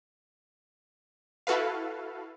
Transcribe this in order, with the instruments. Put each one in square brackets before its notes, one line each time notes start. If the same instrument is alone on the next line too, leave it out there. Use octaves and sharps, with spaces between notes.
[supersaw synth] E4 F#4 A4 B4 F5